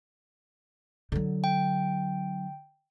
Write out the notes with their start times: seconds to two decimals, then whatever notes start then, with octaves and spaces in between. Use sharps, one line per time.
1.12 D3 F#3
1.44 G5